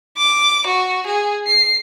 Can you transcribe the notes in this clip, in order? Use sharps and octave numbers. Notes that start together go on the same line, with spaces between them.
D6
F#4
G#4
C7